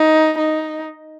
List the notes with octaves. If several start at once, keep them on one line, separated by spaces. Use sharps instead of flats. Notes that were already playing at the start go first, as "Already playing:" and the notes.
Already playing: D#4
D#4